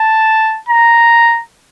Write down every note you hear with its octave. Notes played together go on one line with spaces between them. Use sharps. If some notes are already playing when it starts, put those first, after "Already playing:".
Already playing: A5
A#5